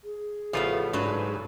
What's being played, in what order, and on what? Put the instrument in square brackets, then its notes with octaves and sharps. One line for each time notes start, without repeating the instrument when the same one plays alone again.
[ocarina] G#4
[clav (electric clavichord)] A1 C#3 F4 [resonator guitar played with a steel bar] F3 A3 B3
[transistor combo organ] G#2 [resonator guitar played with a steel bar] F#3 D4 B4